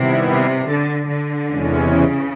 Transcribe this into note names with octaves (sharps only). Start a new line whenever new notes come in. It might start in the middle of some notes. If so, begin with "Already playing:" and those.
Already playing: C3 D#3 G3 B3 E4
C3
D3
D3
E2 C3 E3 G#3 C#4
C#3